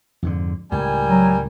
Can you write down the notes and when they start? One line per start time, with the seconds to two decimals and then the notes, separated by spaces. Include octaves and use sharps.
0.23 F2 G#2 D3
0.72 C#2 A2 G3 A#4 G#5
1.07 F#3